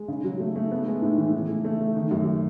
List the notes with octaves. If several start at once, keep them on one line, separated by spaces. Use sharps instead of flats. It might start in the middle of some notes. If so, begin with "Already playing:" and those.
Already playing: G#3
C#3
F#3
A3
A3
B3
G#3
A2
E3
C#3
A3
A3
A3
D#3
F#2